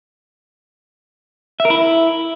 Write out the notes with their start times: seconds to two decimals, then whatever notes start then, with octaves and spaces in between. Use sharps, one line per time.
1.60 E5
1.65 A#4
1.70 E4